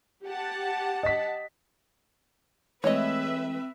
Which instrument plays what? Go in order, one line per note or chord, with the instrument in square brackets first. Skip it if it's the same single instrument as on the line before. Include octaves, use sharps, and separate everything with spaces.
[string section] G4 F#5 A5
[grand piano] D#5 B6
[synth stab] E3 G#3 A3 [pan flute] C4 [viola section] B4 E5 [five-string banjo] C#5 D#5